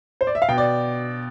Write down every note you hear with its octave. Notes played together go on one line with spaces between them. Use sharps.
C5
D5
E5
F5
B2 G5
D5